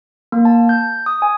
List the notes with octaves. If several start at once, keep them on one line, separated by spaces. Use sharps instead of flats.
A#3
A5
G6
D#6
G#5